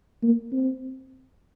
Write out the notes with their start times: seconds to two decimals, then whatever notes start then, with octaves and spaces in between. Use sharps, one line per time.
0.23 A#3
0.52 C4